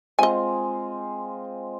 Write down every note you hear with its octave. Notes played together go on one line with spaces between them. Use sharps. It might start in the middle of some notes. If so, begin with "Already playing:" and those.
G#3 C4 F4 D#5 G#5